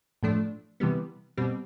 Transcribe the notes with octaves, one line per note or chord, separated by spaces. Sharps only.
A2 F3 A3 D4
C3 E3 G3 B3
B2 G3 C4